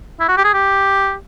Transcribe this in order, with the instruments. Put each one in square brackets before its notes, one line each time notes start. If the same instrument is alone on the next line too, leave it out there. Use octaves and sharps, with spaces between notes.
[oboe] E4
F#4
G4
G#4
G4